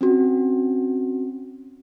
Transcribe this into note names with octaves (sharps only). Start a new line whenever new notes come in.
C4 C#4 F#4